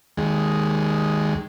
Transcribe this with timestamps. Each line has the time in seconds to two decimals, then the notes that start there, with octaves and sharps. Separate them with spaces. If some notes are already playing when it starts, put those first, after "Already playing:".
0.17 D#2 G#3